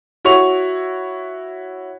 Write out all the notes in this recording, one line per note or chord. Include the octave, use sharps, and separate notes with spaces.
E4 F#4 C#5 C#6 F7